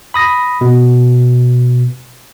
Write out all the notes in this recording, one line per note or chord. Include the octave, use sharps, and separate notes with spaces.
B5 D#6 A#6
B2